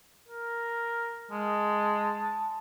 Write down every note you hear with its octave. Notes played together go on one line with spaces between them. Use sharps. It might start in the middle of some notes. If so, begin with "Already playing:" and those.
A#4
G#3 A5